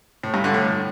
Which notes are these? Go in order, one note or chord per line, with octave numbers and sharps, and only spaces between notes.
A2
G2
D3
A2